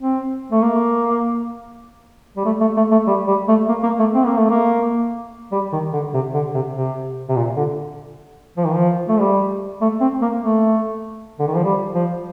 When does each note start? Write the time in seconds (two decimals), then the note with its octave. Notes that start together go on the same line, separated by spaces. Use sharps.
0.01 C4
0.52 A3
0.62 A#3
2.37 G3
2.45 A3
2.61 A3
2.77 A3
2.92 A3
3.07 G3
3.27 G3
3.48 A3
3.69 A#3
3.83 A#3
3.99 A3
4.14 C4
4.26 A#3
4.37 A3
4.50 A#3
5.52 G3
5.72 D#3
5.93 D3
6.14 C3
6.34 D3
6.54 C3
6.74 C3
7.29 C3
7.36 A#2
7.57 D3
8.57 F3
8.66 D#3
8.75 F3
9.08 A3
9.20 G3
9.81 A3
10.01 C4
10.22 A#3
10.42 A3
11.39 D3
11.47 D#3
11.56 F3
11.64 G3
11.95 F3